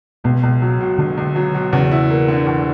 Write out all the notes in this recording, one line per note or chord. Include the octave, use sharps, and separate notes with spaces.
C#2 B2
C#2
F#3
B2
C#2 D3
C#2
F#3
B2
E2 C#3
E4
A#3
D3
E2